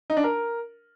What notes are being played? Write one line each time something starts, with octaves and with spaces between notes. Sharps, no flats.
D#4
D4
A#4